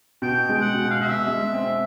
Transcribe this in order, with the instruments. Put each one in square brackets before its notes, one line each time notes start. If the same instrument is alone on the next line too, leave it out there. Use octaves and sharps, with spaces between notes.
[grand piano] B2 [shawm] G5
[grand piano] G#3
[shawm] F#5
[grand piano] B2
[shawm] F5
[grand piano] B2 [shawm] E5
[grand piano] G#3
C4